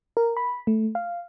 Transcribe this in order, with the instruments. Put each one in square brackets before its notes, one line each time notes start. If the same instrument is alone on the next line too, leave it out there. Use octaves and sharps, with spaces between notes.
[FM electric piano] A#4
B5
A3
F5